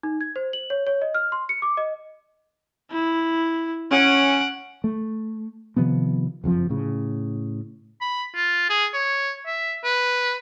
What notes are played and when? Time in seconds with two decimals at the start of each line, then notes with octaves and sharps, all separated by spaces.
0.03 D#4
0.21 G#6
0.36 C5
0.53 F#7
0.70 C#5
0.87 C#5
1.02 D#5
1.14 F6
1.32 C6
1.49 C#7
1.62 D6
1.77 D#5
2.91 E4
3.92 C#4 F#5 D7
4.84 A3
5.76 C3 D#3 F3 B3
6.44 F#1 F2 A#2 F3
6.69 A2 C#3
8.01 B5
8.35 F4
8.70 G#4
8.94 C#5
9.46 E5
9.84 B4